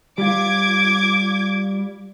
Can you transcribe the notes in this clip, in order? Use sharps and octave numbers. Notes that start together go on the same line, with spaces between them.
G3 F4 D6 G#6